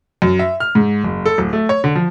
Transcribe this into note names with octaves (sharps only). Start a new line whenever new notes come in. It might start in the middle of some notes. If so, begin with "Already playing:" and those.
F#2
E5
F6
G#2
F#1
A4
D1
A3
C#5
D3
F3